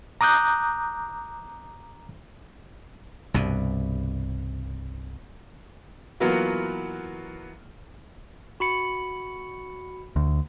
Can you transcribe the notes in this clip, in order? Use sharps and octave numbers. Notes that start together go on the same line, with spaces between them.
A#5 D6 D#6 F#6 G6
C2 G2 B2
E3 F#3 A#3 B3 F4 F#4
F#4 B5 C#7
D2